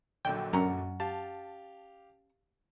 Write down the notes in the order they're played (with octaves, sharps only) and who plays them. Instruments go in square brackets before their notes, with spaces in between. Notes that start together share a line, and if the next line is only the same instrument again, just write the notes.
[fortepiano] A#1 D3 F#3 [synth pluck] G5
[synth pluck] F#2 [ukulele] C#4 F#5 A#5
[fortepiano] G4 F5 [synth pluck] A5